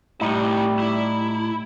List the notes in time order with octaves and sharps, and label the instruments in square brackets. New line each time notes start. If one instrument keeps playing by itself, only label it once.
[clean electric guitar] A2 D#4 [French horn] G3 [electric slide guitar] E4 F#4 G4
[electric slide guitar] E4